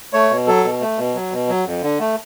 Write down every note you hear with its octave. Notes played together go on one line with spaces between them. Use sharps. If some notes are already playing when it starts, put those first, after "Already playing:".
A3 C#5
B2
F#3 A4
B2
A3
B2
F#3
B2
F#3
F2
D3
A3